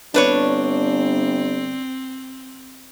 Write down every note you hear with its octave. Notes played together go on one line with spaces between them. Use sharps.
G1 C4 D4 B4 C#5